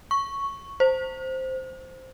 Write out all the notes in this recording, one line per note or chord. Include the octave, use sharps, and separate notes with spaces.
C#6
C5